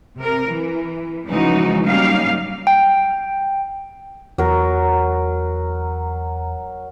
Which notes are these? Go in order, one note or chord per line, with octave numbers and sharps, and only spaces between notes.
C3 A#4
E3
C#3 E3 F3 G#3 D#4 F#4
F#3 G3 A#3 C#4 D#4 F5
G5
E2 F#3 A#4